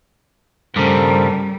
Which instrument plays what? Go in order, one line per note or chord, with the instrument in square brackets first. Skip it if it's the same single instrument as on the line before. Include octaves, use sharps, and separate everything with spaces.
[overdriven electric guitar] G2 C#3 [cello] G3 [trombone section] A4 A#4 C5